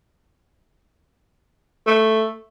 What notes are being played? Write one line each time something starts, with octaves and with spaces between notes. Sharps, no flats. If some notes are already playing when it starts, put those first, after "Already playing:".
A3